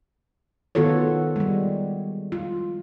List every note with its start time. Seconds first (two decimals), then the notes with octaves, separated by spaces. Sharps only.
0.75 D#3 B3 F4 F#4 A4 C#5
1.36 G3 G#3
2.32 F4